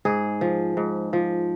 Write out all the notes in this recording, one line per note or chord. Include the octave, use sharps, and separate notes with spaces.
G#2 G#4
F3
G#2
F3